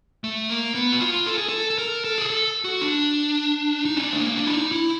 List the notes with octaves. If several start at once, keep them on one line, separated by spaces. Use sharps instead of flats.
A3
A#3
B3
F#4
F4
A4
G#4
A4
A4
A#4
A4
G#4
A4
F#4
D4
D#4
C#4
D4
A3
A#3
D4
E4
D#4
E4